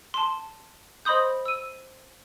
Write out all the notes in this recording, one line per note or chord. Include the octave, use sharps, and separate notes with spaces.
A5 C6
C5 D#5 B5 C6 D#6 G6
E6 D#7